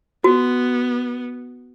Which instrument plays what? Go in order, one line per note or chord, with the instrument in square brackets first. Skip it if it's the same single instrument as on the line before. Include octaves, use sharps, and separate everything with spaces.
[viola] B3 [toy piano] F#4